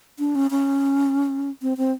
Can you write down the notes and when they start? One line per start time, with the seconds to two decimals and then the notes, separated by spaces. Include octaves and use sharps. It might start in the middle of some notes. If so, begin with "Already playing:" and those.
0.19 D4
0.35 C#4
0.51 C#4
1.62 C4
1.77 C4